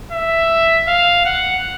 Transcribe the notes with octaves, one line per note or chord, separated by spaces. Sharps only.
E5
F5
F#5